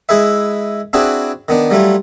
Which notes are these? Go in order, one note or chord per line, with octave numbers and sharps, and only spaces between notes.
G#3 E4 G#4 B4 E5
C4 D4 E4 F#4 G#4 B4
D#3 B3 D4
F#3 G3 A3 E4 F4